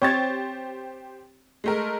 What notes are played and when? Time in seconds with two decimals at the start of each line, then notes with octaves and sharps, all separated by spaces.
0.02 C4 G4 C5 C#5 A6
1.64 G#3 A3 A#4